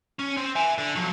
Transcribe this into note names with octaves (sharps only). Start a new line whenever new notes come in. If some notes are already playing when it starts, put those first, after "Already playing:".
C#4
C4
E5 G#5
D3
F3 F#3